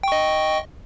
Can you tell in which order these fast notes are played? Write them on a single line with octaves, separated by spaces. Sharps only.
G5 C#6 D#5